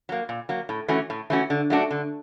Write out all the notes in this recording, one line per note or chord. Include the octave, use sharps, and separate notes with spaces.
F#3 A#3
A#2
F#3 A#3
A2
E3 A3 C#4 F#4
A2
E3 A3 C#4 F#4
D3
F#3 A3 D4 F#4
D3